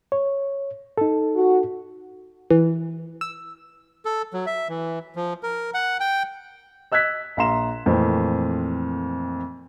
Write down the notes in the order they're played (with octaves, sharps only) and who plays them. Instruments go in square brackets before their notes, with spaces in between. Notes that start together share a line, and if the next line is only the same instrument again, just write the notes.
[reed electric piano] C#5
D#4 A4
[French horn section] F#4
[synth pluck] E3
E6
[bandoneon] A4
F#3
E5
E3
F3
A#4
F#5
G5
[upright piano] D#5 E6 F#6 G#6 B6
A#1 F5 A#5 C6 E7
F2 A#2 E3 A3 C4